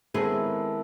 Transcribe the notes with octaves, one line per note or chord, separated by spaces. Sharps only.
D#3 G#3 B3 C4 E4 G#4 A4 B4